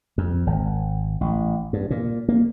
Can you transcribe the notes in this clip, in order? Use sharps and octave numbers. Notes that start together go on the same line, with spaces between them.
F2
G#1
A1
G2
A#2
A#3